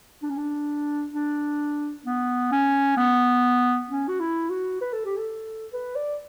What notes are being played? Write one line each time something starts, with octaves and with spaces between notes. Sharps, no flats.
D4
C#4
D4
D4
B3
C#4
B3
C#4
F#4
E4
F#4
B4
A4
G4
A4
B4
D5